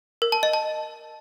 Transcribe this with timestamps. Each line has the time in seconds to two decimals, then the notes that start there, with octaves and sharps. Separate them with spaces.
0.22 A#4
0.32 A5
0.43 D#5
0.53 A5